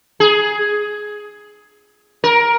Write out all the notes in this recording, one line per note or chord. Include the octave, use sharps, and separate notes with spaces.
G#4
A#4